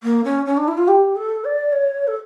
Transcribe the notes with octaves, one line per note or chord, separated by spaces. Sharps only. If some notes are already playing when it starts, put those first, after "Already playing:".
A#3
C#4
C#4
D4
E4
F4
G4
A4
D5
C#5
A4